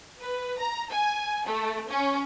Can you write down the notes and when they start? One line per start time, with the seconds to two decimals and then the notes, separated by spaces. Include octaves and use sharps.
0.19 B4
0.59 A#5
0.91 G#5
1.45 A3
1.90 C#4